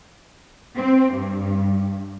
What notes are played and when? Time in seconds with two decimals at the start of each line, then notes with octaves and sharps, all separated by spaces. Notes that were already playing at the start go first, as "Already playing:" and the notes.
0.76 C4
1.13 G2